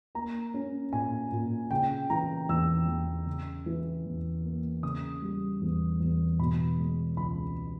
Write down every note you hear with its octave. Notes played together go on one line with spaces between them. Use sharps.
A#3 A#5
C#4
A#2 G#5
A#2
C#3 G5
E3 A#5
E2 E6
E2
C#3
E3
E2
A#3
C#3 D#6
G3
E2
E2
B2 B5
G#3
C#2 B5